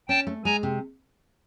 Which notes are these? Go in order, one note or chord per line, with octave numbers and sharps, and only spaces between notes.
C#4 G5 A5
A3
G#3 G#5 A#5
C3